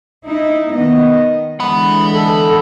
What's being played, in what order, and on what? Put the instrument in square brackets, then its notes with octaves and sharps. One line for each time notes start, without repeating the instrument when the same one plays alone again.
[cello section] D#4 E4
D#3 B3 D#5
[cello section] D3 E3 G#3 [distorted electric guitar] F#5 B5
[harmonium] A4